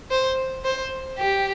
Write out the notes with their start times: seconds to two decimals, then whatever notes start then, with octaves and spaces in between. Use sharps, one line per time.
0.11 C5
0.65 C5
1.19 G4